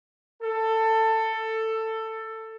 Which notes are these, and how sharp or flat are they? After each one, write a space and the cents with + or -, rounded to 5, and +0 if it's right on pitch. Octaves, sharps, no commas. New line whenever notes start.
A4 +15